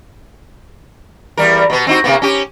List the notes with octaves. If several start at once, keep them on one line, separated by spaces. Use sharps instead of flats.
E2 G3 A#4
B2 B3
C4 D#4 F#4
C3 A#3 B3
C#4 G4